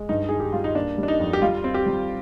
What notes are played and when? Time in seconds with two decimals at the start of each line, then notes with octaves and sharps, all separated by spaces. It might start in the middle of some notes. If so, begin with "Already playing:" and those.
Already playing: G#3
0.09 G2 D#4
0.29 D#3 G#4
0.40 G4
0.52 G3 F4
0.64 D#4
0.75 A#3 D4
0.98 G3
1.03 D4
1.08 D#4
1.20 F2
1.33 G4
1.42 G3 F4
1.64 C4
1.74 G4
1.86 G3